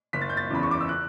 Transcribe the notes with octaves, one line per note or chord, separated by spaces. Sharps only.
F#1 B6
A6
G6
A6
E2 C#3 E3 B5
C#6
D6
E6
F#6